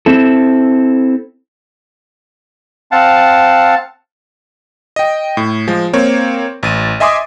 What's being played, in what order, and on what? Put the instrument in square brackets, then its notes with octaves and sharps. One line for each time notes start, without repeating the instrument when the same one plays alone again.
[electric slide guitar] C4 E4 A4
[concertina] C4 F5 F#5 A5
[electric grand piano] D#5 G5
A2
F3 G#3
A#3 C4 C#5
A1 A6 D#7
D#5 E5 G#5 C6 D6 D#6